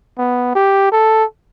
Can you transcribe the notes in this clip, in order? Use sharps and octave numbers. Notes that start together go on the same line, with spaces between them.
B3
G4
A4